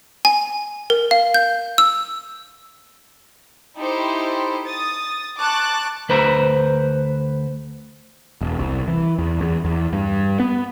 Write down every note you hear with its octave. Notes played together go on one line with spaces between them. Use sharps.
G#5
A#4
F5
G6
E6
D#4 E4 G4 A4 C5
D#6 A6
A5 C#6 D6 F#6
D2 B4 C5 A#5
E1
C2
E3
E2
E2
E2
G2
B3